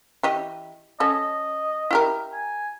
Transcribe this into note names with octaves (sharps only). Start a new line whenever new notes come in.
E3 G4 D#5
C#4 A4 D#5
E4 G4 A#4
G#5